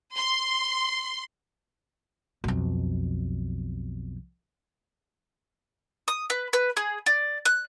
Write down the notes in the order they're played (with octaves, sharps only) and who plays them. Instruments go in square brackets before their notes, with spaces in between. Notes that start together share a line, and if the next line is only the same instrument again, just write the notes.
[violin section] C6
[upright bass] B1 F2
[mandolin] D#6
B4
B4
G#4
D5
F#6